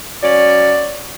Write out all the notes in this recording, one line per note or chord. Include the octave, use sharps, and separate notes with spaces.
F#3 C#4 D5